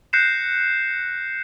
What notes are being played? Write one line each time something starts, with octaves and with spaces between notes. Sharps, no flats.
F#6 G6 A#6 C7 C#7 E7